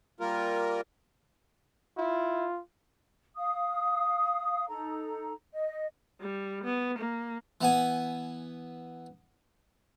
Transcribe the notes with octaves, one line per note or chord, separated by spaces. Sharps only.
G3 A#3 F4 A#4
E4 F4
F5 D#6
D#4 A4 A#5
D#5
G3
B3
A#3
E3 B3 G#5